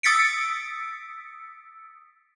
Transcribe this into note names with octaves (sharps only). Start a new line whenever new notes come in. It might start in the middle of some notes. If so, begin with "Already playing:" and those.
D#6 E6 A6 B6 C#7 D7